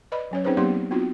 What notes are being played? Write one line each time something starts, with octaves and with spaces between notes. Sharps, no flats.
B4 D5 D#5 B5
F#3 C#4 C#5
C4 C#4 D#4 G#4 B4 C5
F#3 A#3 B3 D#4 G4 C6
B3 C4 D#4 F4 F#4